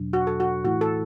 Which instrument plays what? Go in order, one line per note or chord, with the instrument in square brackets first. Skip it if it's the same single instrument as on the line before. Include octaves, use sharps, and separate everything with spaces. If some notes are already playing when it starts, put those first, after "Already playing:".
Already playing: [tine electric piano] E2 B2 F#3 D4
[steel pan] F#4
A4
F#4
[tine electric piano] A2 E3 A3 E4 [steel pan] F#4
[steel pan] A4